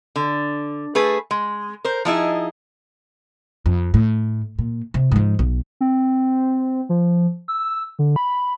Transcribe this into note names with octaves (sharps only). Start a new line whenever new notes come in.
D3
A3 G#4 B4
G#3
A#4 C5
F3 D#4 E4 G#4
F2
A2
A#2
C3
G#2 F3
B1
C4
F3
E6
D3
B5